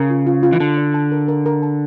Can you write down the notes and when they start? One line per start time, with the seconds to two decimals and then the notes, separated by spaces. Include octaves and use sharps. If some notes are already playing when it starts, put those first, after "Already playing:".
Already playing: C#3 A#4
0.10 F4
0.27 F4
0.43 F4
0.52 E3
0.60 D3 A5
0.78 D5
0.94 A5
1.12 A#4
1.28 A#4
1.46 A#4
1.63 A5